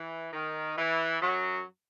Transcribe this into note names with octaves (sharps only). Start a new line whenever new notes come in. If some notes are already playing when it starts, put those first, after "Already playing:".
Already playing: E3
D#3
E3
F#2 F#3